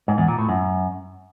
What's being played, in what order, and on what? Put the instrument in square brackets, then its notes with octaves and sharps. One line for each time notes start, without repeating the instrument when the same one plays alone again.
[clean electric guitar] G#2
E2
A#2
A2
F#2